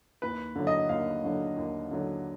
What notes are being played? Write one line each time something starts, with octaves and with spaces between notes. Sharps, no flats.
D#2 B4
D3 F#3
D#5
D#2 F5
D3 F#3
D#2
D3 F#3